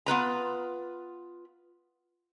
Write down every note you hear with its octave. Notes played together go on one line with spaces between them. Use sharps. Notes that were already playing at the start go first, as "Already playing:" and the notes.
B3 F4 B4 A#5